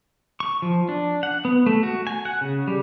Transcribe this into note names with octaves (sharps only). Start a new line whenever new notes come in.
C#6
F3
D4
F#5
B3
A3
F#4
G#5
F#5
C#3
G3